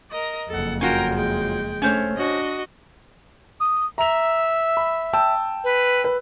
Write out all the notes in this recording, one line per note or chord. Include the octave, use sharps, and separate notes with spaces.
A#4 D#5
F#1 F2 A4 F#5
C#4 F4 F#4 A#4 G5
G#3 G5
A3 C#4 C5 C#5
D4 F#4 D#5
D#6
E5 A#5 F7
B5
G5 A5 E6
B4
B4